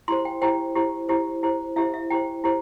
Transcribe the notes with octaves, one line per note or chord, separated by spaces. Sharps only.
E4 G4 C5 C6
G5
E4 G4 C5 G5
E4 G4 C5
E4 G4 C5
E4 G4 C5
E4 G4 C5 E5
E5
E4 G4 C5 G5
E4 G4 C5